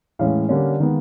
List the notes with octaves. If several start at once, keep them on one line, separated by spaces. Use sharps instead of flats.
A2 E3 G#3 C#4 F5
D3 G3 A#3 C#4
D#3 G#3 B3